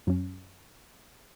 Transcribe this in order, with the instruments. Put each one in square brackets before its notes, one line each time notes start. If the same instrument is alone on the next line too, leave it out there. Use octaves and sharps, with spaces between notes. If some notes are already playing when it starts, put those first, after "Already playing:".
[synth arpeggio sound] F#2 F#3 C#4